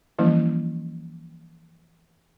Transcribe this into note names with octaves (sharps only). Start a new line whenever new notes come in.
E3 F3 G3 A#3 C#4 E4